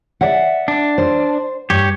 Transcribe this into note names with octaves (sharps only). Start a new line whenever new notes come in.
D5 E5 F#5
D4
C5
G2 G4 C#5